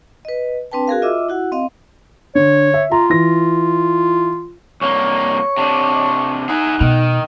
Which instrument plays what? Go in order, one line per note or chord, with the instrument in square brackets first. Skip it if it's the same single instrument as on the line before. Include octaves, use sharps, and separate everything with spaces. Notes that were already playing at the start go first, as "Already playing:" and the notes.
[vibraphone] B4 D#5
C4 D4 B4 G5 A5
F#4 G#4 A#4 F5
F4 D#5 E5 D6 E6
E4 F#4 F#5
C4 D#5 F5
[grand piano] D3 [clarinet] C#5
[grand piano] E5
[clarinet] F4 [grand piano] A#5
[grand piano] E3 A#6
[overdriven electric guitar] C2 A#3 [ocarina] C#5 [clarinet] C#6
[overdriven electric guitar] C3 D4
[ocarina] D#4 [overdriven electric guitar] E4 G#4 [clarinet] F#5
[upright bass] B2 [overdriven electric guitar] D#3